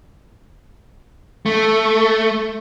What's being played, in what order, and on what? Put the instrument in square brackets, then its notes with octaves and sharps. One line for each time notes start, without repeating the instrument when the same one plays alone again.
[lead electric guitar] A3